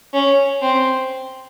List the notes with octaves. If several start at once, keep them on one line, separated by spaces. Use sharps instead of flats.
C#4
C4